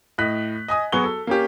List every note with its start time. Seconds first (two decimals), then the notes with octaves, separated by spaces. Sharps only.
0.18 A2 D#5 F#6 B6
0.68 D#5 G#5 D#6
0.92 F#3 B3 F#4 G#4 C#6 G7
1.04 A4
1.27 A#3 C#4 G4